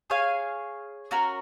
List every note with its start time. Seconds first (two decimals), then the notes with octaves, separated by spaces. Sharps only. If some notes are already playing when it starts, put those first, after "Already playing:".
0.10 G#4 C#5 F5 G#5
1.11 C#4 F#4 A#4